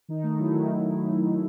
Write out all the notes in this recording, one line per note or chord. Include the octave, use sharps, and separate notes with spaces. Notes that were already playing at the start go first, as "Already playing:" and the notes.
D#3 D#4
A3 D#4
F#3 E4
D#3